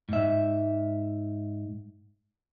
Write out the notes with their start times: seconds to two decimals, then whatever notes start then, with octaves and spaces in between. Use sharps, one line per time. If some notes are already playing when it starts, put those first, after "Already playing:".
0.09 G#2 E5